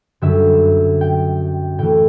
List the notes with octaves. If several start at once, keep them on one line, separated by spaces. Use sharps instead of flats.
F#2 D3 G3 E5
G5
A2 E3 A3 G5